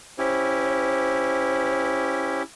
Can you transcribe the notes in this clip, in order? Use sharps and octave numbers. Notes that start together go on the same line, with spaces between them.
C#4 E4 G4 C5